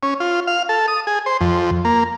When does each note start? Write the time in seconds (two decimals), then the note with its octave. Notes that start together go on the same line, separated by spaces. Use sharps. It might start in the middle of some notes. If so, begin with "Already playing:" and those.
0.03 C#4
0.20 F4
0.47 F5
0.69 A4
0.88 D#6
1.07 G#4
1.26 C5
1.41 F2
1.85 A#3